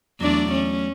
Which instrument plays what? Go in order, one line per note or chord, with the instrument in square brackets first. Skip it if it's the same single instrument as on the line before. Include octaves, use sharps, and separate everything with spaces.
[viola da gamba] E2 D4 D5 [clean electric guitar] F#3 A3
[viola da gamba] C#4